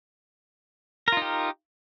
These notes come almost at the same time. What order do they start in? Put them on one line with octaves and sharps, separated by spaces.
A#4 F4 D#4 G4